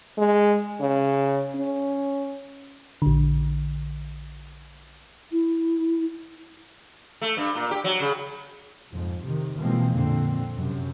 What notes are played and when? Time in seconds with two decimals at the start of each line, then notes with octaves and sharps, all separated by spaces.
0.18 G#3
0.81 C#3
1.55 C#4
3.02 A#1 D3
5.32 E4
7.21 A3
7.37 G2
7.55 A#2
7.71 G4
7.84 F#3
8.00 C#3
8.92 F2 G#2
9.23 C3 D#3
9.57 B2 E3 F3 G#3 A#3 C4
9.94 F2 A#2 D3 C4
10.57 F#2 C3